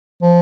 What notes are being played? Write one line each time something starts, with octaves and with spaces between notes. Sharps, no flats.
F3